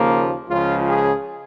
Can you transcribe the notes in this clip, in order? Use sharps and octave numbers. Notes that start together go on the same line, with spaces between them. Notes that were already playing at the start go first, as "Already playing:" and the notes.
Already playing: D#2 C#3 F3 A#3
C#2 C#3 F3 F4
G#4